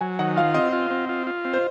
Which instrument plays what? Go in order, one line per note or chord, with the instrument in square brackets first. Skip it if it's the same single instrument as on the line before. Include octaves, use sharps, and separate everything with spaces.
[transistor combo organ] F#3 [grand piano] G#5
[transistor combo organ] D#3 [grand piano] F#5
[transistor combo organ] F4 [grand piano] F5
[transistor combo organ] C4 [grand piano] D#5
[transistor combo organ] F4
C4
F4
F4
C4
[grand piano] C5